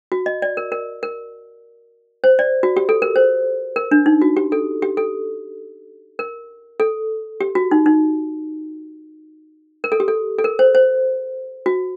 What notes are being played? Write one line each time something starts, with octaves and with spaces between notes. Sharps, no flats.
F#4
D#5
D5
A#4
A#4
A#4
C5
D5
F#4
G4
A4
A#4
C5
A#4
D4
D#4
F#4
G4
A4
G4
A4
A#4
A4
G4
F#4
D#4
D#4
A#4
A4
G4
A4
A4
A#4
C5
C5
F#4